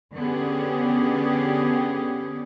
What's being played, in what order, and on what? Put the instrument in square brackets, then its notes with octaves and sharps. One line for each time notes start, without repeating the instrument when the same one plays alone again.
[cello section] D3 B3 C#4 G4 G#4